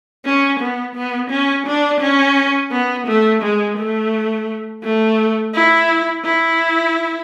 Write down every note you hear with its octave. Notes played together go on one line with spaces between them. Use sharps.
C#4
B3
B3
C#4
D4
C#4
B3
A3
G#3
A3
A3
E4
E4